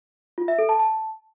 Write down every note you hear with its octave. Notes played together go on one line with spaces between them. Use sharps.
F4
E5
A4
A5
A5